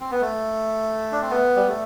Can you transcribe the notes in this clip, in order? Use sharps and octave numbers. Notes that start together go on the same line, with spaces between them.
C4
B3
A3
D4
C4
B3
G3
A3